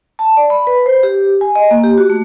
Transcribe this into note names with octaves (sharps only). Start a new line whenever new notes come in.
A5
D5
B5
B4
C5
G4
G#5
D#5
A#3
G4
F#4
A3